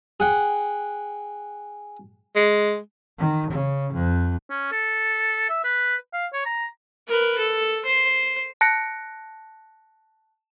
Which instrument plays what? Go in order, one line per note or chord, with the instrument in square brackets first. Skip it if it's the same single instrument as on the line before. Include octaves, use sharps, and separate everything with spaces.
[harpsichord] G#4 F#5 G5
[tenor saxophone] G#3
[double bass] D#3
C#3
F2
[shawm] C#4
A4
E5
B4
F5
C#5
A#5
[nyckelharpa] A#4 B4
A4
C5
[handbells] A5 F#6 A#6 C#7